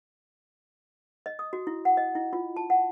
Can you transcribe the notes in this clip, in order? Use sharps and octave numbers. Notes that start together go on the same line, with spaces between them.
D#5
D#6
F#4
E4
F#5
D#5
E4
F4
A5
F#5